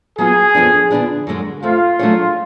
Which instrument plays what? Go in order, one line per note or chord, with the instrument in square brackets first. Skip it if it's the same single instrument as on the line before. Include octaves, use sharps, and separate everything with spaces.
[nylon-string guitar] F#3 B3 F4 [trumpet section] G#4
[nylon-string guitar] F2 F3 B3 D4
D3 F3 B3 D4 G#4
F#2 D3 G#3 C#4
[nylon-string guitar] F2 F3 A3 [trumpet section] F4
[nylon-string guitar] F#3 A3 D4 G#4 C#5